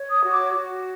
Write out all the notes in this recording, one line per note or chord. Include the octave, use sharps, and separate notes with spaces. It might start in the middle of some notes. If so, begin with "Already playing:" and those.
Already playing: C#5
D#6
F#4
D6
F#4